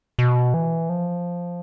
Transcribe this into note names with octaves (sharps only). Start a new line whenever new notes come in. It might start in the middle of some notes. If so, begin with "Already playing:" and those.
B2
E3
F3